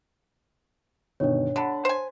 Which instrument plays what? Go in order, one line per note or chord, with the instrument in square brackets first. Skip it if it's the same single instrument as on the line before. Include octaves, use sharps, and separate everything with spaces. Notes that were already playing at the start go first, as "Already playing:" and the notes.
[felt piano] G1 B2 D#3 [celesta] D4 C#5
[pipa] D3 [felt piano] F#5 A5 B5
[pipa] C5 G#5